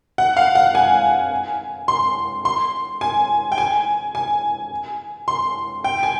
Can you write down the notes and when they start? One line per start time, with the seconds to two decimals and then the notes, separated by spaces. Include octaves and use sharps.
0.18 F#5
0.37 F5
0.55 F#5
0.75 G#5
1.88 C6
2.45 C6
3.01 G#5
3.52 G5
3.58 G#5
4.15 G#5
5.28 C6
5.84 G5
6.03 G#5